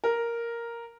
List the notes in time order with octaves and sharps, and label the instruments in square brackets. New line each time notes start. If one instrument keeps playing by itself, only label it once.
[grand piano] A#4